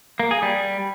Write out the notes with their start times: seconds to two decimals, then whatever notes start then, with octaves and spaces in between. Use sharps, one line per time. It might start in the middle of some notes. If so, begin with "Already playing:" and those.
0.20 A#3
0.31 G#4
0.42 G3